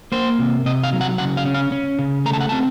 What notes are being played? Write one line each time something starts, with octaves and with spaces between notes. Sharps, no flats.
A#3 C5
C3
C3 D#5
F5
F#3
F#5
C#3 F#5
F5
C#4
F5
C#4
C#3
A3 A#5
A5
F#5
C4 A5